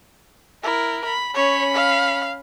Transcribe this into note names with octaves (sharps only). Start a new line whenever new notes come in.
E4 A#4
B5
C#4 C#5 B5
F5